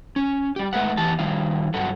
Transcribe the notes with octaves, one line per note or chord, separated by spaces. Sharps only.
C#4
G3 G4
G#3 A3 B4 F#5
E2 E3 G4 A5
D#3 G3 E4 F5
G2 F#3 A4 F#5